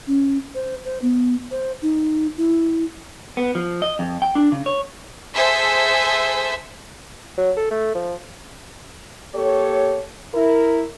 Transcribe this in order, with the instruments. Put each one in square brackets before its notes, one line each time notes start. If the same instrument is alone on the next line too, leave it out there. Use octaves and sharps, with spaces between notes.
[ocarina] C#4
C5
C5
B3
C5
D#4
E4
[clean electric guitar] B3
F3
D#5
F2
G5
D4
C#3
C#5
[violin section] G#4 A4 C5 E5
[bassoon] F#3
A4
A3
F3
[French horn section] A#3 G4 A4 C#5
E4 A#4